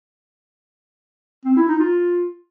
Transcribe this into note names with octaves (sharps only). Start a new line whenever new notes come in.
C4
E4
D#4
F4